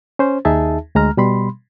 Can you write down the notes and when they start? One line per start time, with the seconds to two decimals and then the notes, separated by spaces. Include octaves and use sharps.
0.19 C#4 C5
0.45 D#2 D#4 G#4 E5 A5
0.95 D2 G#3 A#5 F6
1.17 B2 G3 B5 C6